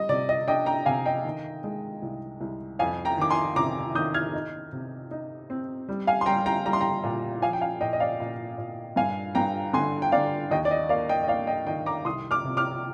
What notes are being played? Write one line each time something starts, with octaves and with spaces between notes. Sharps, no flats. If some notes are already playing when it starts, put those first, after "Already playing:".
Already playing: G3 D#5
C3 D5
D#5
D4 D#5 G5
G5 A#5
C3 F5 G#5
D#5 G5
D#3
G#3
C2
C2
F2 F5 G#5
G5 A#5
D#3 D6
G#5 C6
C3 A#5 D6
D#3 D#6 G6
F6 G#6
D#4
C3
D#4
C4
G3
F5 G#5
C6
G3 G5 A#5
G5 A#5
G3 A#5
C6
G5 A#5
A#2
F3 F5 G#5
G5
F5 G#5
A#2 D#5 G5
D#5
D5 F5
A#2
A#2
G2 F5 G#5
G2 G5 A#5
D3 G#5 C6
G5
D3 D5 F5
D#2 D#5 G5
D5
D#5
A#3 D5 F5
D#5 G5
D#5
A#3 D5 F5
D#5 G5
D#3 D#5 G5
A#5 D6
C2 C6 D#6
D6 F6
C3
D6 F6